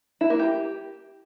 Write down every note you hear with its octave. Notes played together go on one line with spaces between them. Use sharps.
E4
A#3
G4